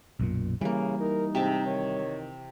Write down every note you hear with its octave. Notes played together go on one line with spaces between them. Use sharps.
B1 F#2 A#2
C#3 E3 G3 A#3
D#4 A#4
G#2 C3 E5 A5
D#3 C#5